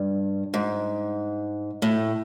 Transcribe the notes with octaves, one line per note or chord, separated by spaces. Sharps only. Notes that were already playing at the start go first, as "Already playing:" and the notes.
Already playing: G2
G#2
A2